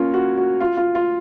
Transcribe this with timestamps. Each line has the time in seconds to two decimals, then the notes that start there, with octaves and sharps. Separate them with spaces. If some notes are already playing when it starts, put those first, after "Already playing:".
Already playing: A#3 C#4 F4
0.14 F#4
0.37 F#4
0.60 F4
0.77 F4
0.95 F4